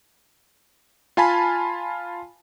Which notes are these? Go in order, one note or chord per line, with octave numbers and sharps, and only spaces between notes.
F4 F5 G#5 A5 B5